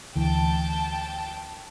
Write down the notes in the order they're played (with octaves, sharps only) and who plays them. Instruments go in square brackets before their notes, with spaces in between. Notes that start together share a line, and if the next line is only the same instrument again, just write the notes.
[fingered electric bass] D2 E3 [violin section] G5 A5